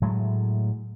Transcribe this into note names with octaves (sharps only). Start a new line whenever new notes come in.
A2 F#3 G#3 A3